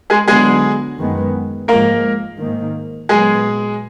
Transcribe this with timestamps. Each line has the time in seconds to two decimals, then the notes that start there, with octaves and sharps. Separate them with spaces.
0.10 G#3 G#4
0.28 D3 F#3 G#3 B3 G#4
0.98 F#2 D#3 G#3 B3
1.68 G#2 F3 G#3 A#3 A#4
2.39 G#2 D#3 A#3
3.09 A#2 F#3 G#3 B3 G#4